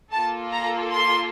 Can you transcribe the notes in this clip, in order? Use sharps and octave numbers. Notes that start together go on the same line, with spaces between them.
A#3 F4 A4 A5
A#5
C6